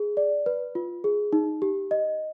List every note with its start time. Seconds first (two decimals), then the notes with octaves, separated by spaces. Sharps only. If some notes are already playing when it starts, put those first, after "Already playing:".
Already playing: G#4
0.17 D5
0.46 B4
0.75 F4
1.04 G#4
1.33 D#4
1.62 G4
1.91 D#5